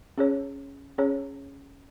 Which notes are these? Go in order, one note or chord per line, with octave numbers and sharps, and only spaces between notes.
C#4 G#4 C#5
C#4 G#4 C#5